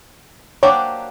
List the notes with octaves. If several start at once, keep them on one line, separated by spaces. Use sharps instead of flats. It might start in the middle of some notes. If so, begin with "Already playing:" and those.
F#3 A#3 D4 G4 C5 C#5